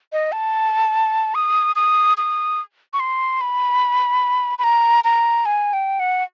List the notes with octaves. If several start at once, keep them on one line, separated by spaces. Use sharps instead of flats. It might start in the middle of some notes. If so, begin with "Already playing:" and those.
D#5
A5
D#6
D#6
D#6
C#6
C6
B5
B5
A#5
A#5
G#5
G5
F#5